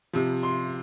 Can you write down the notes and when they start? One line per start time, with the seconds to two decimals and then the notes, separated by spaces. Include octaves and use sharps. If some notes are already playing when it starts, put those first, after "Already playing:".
0.13 C3 F3
0.43 C6